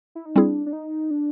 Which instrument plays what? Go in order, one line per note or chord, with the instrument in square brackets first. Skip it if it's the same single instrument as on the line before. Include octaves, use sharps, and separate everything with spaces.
[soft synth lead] E4
D#4
[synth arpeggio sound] G3 C4 E4 G#4 [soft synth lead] D4
[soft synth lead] D4
D#4
D4